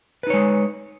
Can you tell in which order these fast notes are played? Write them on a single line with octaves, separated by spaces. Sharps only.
B4 D#4 C#5 G#3